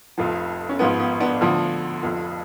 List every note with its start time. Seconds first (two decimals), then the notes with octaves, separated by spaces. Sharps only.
0.18 F1 F2 F3
0.69 C#4
0.79 G#1 G#2 F3 B3
1.00 B3
1.20 B3 D4
1.41 D2 D3 F3
2.03 F1 F2 F3